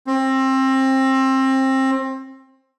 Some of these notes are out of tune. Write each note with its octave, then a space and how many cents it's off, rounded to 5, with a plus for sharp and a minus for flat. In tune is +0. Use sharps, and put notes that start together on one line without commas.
C4 +25